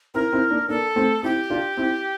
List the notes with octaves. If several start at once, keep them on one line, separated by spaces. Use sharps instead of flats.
C4 E4 A#4
C4 E4
A#3 D4
A#3 D4 A4
A3 C4
C4 E4 G4
D4 F4
C4 E4